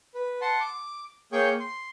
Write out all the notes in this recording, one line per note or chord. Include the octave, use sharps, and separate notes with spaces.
B4
F#5 A5 C6
D6
A#3 G#4 C#5 G5 C#6 G6
C6